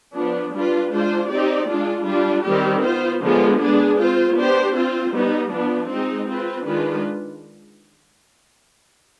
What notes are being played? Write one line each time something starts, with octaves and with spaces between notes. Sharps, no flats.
F3 B3 D4
G3 D4 F4 B4
G#3 D4 F4 C5
C4 D#4 G4 D5
G#3 D4 F4
G3 D4 F4
D#3 G3 C4 G4
B3 F4 C5
D3 F3 G#3 B3 F4
G#3 B3 D4 G#4
C4 F4 C5
B3 D4 G4 C5
C4 F4 C5
G3 B3 D#4
F3 B3 D4 F4
G#3 C4 D#4
C4 F4 B4
D#3 G#3 D4 F4 B4